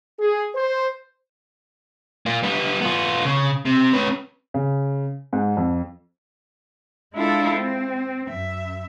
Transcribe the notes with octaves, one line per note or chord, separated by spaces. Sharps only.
G#4
C5
A#3 F4
G3 B3
B3 F4
C#3
C3
C#4 B4
C#3
G#2
F2
G#3 D4 E4 F4 A4
C4
F#2 E5